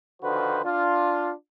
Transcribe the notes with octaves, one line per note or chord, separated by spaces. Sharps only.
D3 D#3 F3 F#4 B4 C5
D4 F4